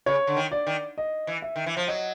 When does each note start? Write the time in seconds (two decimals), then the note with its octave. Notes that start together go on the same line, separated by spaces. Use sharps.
0.06 C#3 C#5
0.27 D3
0.37 D#3
0.51 D5
0.67 D#3
0.98 D#5
1.27 E3
1.42 E5
1.56 D#3
1.66 E3
1.77 F3
1.87 F#3 D#5